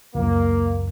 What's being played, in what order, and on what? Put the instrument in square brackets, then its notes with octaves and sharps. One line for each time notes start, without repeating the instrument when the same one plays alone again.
[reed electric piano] C#2 F#2 [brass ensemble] A#3